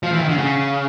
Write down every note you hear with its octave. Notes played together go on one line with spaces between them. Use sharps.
F3
E3
D#3
D3
C#3